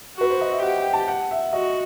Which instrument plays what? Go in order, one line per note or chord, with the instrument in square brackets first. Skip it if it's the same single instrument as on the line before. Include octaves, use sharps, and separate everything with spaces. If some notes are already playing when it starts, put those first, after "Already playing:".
[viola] F#4 [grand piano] B4
[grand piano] C5
D#5
E5
[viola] G4 [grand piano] F#5
[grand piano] G5
A5
F#5
E5
[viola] F#4 [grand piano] D#5